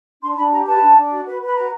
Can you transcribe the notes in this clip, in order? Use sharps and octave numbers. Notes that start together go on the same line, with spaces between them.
D4 C6
D4 B5
G4 A#5
B4 A5
D4
D4
F#4
B4
B4
B5
F#4 A#5